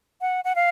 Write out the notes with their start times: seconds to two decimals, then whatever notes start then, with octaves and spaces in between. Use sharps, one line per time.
0.21 F#5
0.45 F#5
0.56 F5